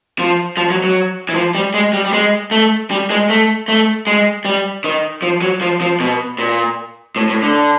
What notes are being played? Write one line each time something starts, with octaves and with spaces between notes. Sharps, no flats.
F3
F3
F#3
F#3
E3
F3
G3
G#3
G3
G3
G#3
A3
G3
G#3
A3
A3
G#3
G3
D#3
F3
F#3
F3
F3
B2
A#2
A2
A2
D3